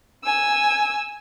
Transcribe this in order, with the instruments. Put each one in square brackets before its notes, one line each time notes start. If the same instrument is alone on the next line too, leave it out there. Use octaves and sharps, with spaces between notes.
[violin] G#5 E6